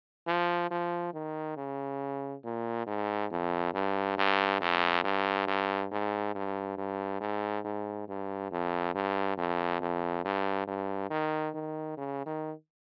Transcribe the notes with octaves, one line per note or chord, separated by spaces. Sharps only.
F3
F3
D#3
C#3
A#2
G#2
F2
G2
G2
F2
G2
G2
G#2
G2
G2
G#2
G#2
G2
F2
G2
F2
F2
G2
G2
D#3
D#3
C#3
D#3